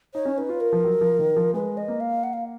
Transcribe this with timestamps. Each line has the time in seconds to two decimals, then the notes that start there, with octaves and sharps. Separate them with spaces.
0.14 D#4 C#5
0.25 C#4
0.38 D#4 B4
0.49 F4
0.60 A#4
0.73 F3
0.84 F#3
1.01 F3
1.19 D#3
1.36 F3
1.54 G#3 B4
1.77 D#5
1.88 A#3
2.00 F5
2.24 F#5
2.33 F5